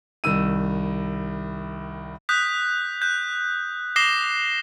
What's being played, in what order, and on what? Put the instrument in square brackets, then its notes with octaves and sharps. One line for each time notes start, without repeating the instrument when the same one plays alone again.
[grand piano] C2 D#3 E6 D#7
[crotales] D#6 F#6 G6 B6
F#6 G6
D6 D#6 A#6 C7 E7 G7